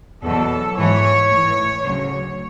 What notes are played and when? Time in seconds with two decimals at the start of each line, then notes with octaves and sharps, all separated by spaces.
0.23 E2 B2 F#3 A4
0.78 G#2 E3 C#5
1.30 A2
1.35 E3
1.84 D2 C#3 F#3 C#5